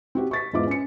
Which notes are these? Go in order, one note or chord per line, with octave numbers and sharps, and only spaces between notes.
C4 F#4 G4
C#6 A6 B6
E2 G#2 F4 E5 D6
C#4 C#7